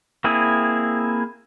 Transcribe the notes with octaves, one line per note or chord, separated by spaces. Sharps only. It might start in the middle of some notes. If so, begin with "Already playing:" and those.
A#3 C4 E4 G#4